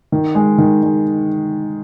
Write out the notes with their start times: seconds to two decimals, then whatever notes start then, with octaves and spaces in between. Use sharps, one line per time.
0.12 D#3
0.35 G#3
0.58 D#3
0.83 G#3